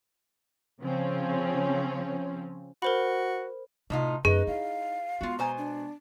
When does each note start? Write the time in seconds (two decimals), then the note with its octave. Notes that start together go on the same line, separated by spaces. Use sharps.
0.81 C#3 F3 C4 C#4
2.82 F#4 A#4 C5 B5
3.90 A2 C3 D#4 F4
4.25 F#2 A3 D#4 G#4 B4
4.47 E4 F5
5.21 G#3 B3 F4 F#4
5.39 B2 C5 G#5 A#5
5.58 D4